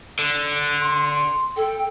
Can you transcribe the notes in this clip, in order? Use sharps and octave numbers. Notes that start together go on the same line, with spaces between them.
D3
C6
A4 G5